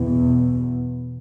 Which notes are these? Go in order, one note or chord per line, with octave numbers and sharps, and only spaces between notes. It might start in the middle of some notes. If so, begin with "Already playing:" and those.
Already playing: E2 B2